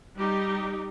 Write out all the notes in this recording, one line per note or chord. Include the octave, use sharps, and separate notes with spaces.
G3 D#4 G4